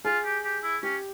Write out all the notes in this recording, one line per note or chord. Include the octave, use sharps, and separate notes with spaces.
F4 G#4
G4
G4
E4
C#4 G4